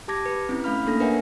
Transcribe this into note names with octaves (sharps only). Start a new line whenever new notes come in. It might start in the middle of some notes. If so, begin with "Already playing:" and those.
G4 A5 D6 G#6 A#6
B4
C4 C#4 E4
A3 C#4 F5 B5 F6
A#3 D4 A4 A#6
A#4 B4 C#5 E5 F#5 G#5